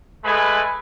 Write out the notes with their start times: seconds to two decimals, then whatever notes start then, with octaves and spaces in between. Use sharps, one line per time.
0.25 G#3 A3 B4 G#5 B5